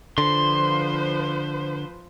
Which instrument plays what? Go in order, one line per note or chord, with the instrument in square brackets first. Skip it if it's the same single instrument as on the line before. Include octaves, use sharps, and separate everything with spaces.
[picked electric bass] D3 [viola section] F3 B4 C5 [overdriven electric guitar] C6